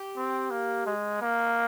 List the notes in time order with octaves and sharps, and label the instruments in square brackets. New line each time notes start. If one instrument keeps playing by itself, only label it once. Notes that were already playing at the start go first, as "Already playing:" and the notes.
Already playing: [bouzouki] G4
[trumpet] C4
A#3
G#3
A#3